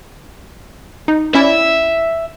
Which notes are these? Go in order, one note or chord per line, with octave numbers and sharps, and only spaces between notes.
D#4
C#4 E4 D5 E5